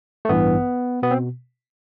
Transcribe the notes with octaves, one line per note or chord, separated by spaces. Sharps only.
A3
A1 G2 E3 B3
B2 B3
C4